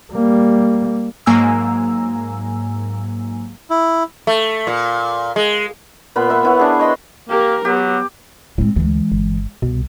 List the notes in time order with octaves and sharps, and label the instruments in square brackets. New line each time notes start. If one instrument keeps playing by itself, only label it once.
[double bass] G3 A#3
[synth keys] G#2 F#3 A#3 G#5 A#5 E6
[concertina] E4
[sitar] A3
A#2
G#3
[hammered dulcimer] A#2 B3 B5 C6
B4 E5 F#5
B3 E4 C#5
D4 G#4
C#5 D#5 B5 C6
[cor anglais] A#3 [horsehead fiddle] G4 A#4
[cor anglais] F#3 [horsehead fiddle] B3 [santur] G4
[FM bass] A2 [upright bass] G#3 C4
[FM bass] D2 [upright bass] E3 G#3
[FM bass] G1
[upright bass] C2 [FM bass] B2